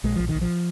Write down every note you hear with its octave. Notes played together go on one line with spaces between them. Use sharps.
A#1 G#3
A#1 F3
D#3
A#1
F3